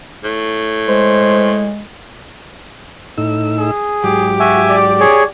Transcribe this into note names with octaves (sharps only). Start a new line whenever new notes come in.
A2
G#3 C5
A2 D#4 E6
G#4
G#2 F#3 G4
F#4 E5 G#5
D5
G#4 C#5